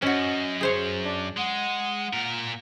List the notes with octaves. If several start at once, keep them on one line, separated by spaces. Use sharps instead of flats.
F#2 C#4 F#4 D#5
G#4 C5 C#5
D4
G#3 F#5
A#2 A#4